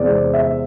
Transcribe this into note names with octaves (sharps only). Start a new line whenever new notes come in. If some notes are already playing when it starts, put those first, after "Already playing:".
Already playing: E2 C3 G#3 C4 D5
E5